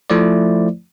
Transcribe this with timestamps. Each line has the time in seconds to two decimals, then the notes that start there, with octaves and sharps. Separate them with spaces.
0.10 F3 A3 E4 C5 D5